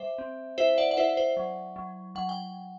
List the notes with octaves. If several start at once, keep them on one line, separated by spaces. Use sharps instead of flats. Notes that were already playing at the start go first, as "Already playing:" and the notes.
Already playing: G3 C5 E5
C4
E4 C5 E5
D5 F#5
F#5
E4 C5 E5
C5
F#3
F#3
F#3 F#5
G5